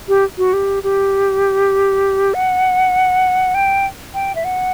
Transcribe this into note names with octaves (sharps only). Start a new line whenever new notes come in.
G4
F#4
G4
G4
F#5
G5
G5
E5
F#5